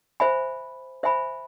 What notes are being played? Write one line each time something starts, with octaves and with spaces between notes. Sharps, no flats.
C5 E5 G#5 B5
C5 E5 G#5 B5